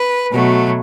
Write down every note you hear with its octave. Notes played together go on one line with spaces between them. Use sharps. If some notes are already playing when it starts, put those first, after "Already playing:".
Already playing: B4
B2 F#3 A3